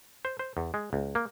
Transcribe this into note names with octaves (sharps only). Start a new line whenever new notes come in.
C5
C5
E2
G#3
C#2
A#3